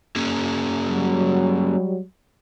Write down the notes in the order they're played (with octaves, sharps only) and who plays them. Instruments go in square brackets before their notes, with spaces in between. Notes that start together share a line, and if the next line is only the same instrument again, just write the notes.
[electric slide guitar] A#3 C#4 G#4
[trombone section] F#3 G3